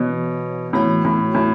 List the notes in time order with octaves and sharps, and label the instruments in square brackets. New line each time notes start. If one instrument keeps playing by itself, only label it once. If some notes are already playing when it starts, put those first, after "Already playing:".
Already playing: [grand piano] B2 [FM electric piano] E3 B3 C#5
[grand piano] A2 [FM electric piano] E3 B3 F#4 C#5
[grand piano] A2
A2